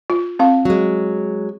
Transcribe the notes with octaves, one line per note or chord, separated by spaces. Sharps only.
F4
C4 F5
F#3 G#3